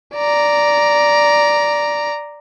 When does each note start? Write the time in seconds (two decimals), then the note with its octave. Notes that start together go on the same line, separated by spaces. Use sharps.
0.16 D5 A#5